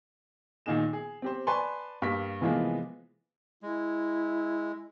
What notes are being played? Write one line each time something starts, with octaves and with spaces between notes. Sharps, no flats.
A#2 D#3 D#4 G#4 E7
G#4
C4 G4 C5
B4 D5 G#5 A5 C6 C#6
G2 G3 A#3 B6
C3 E3 F3 G#3 A#3 B3
G#3 E4